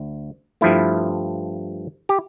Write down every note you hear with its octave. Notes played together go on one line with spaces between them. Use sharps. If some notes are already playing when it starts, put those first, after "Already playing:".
Already playing: D2
G2 F3 A3 E4
G4